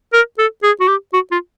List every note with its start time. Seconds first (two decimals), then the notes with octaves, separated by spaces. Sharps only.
0.13 A#4
0.38 A4
0.63 G#4
0.81 F#4
0.88 G4
1.13 F#4
1.32 F4